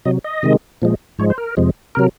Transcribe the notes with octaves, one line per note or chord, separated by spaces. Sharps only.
C3 F#3 D#5
D#5
C3 D#3 G#3
A#2 F3 G#3
G#2 F3 G#3 C#5
C5
A#4
F2 C3 F3 G#3
C3 F#3 A#4